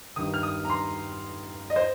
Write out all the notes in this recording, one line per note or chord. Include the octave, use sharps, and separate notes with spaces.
G2 D#3 D#6
F6
D#6
A#5
C6
D#5
C5